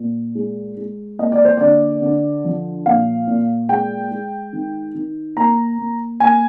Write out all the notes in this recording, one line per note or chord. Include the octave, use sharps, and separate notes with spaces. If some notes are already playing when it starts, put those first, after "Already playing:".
Already playing: A#2
G#3
G#3
A#3 D#5
D5
C5
D3 D5
D3
F3
A#2 F5
A#2
G#3 G5
G#3
D#3
D#3
A#3 A#5
A#3
A#3 G#5